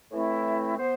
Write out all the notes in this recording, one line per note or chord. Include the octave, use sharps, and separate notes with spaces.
A2 E3 A3 C4 E4
B3 C5